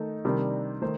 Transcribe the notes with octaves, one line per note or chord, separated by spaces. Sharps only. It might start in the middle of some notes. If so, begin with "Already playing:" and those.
Already playing: D#3 A3 D#4 A4
C3 D#3 G3 D4
D#3 A3 C5